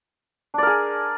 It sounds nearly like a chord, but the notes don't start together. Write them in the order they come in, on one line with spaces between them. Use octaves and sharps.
D4 D5 A#4 G#4